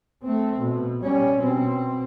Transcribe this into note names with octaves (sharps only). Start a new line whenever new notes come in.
A3 C4
B2
G3 C#4
B2 C4